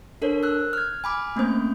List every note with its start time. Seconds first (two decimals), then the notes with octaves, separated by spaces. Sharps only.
0.22 D4 A4 A#4 C5 C#5
0.43 E6 F#6
0.73 F6 G#6
1.04 G#5 B5 D6 F6
1.36 A3 A#3 C4 C#4 C5 G6